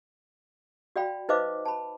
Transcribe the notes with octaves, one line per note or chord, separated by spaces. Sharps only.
F#4 D5 F5 G5 B5
D#4 B4 C5 D#5 F5 D6
A5 B5